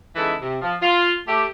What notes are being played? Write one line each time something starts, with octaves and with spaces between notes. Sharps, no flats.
C#3 E3 G#3 D#4 E4 A4
C3
F3
F4
A3 G4